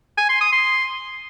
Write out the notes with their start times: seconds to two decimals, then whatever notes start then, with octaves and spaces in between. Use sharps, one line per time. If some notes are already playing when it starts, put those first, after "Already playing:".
0.17 G#5
0.29 C6
0.41 D#6
0.52 C6